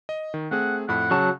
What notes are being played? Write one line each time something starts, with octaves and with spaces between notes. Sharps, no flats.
D#5
D#3
A3 C4 G#4 F#5
F2 A2 F#5 B5
C#3 F#3 A5